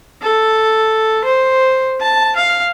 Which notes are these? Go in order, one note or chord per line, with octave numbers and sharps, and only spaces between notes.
A4
C5
A5
F5